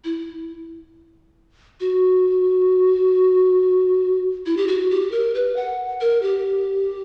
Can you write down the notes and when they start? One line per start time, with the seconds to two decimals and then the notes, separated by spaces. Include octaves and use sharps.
0.04 E4
1.80 F#4
4.46 E4
4.57 G4
4.68 F#4
4.91 G4
5.12 A#4
5.34 B4
5.56 F#5
6.01 A#4
6.22 G4